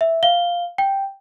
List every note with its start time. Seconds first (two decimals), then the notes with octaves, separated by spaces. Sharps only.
0.01 E5
0.23 F5 G7
0.78 G5